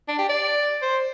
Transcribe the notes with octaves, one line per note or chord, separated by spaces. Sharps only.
D4
G4
D5
C5